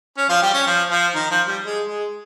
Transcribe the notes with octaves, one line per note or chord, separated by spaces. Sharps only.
C#4
F3 F4
G3 G4
C#4
F3
F3
D#3
F3
G3
G#3
G#3